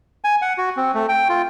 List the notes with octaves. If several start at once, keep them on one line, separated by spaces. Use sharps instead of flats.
G#5
F#5
F#4
C4
A3
G5
F4